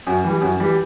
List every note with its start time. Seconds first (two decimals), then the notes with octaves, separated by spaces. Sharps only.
0.07 F#2
0.24 E3 G3
0.41 F#2
0.60 E3 G3